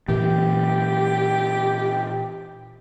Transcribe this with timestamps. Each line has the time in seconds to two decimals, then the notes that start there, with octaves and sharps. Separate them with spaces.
0.08 A#2 E3 G4